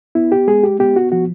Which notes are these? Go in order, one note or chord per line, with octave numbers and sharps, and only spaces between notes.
B3 E4
G4
G#3 G#4
G4
B3 G4
F#4
F3 F#4